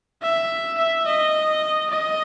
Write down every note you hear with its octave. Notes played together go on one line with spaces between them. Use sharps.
E5
E5
D#5
D#5